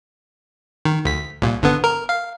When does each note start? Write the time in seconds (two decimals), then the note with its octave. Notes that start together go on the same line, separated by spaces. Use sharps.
0.85 D#3
1.05 D2 B6
1.42 C2 A#2
1.62 G1 D3 B3
1.84 A#4
2.09 F5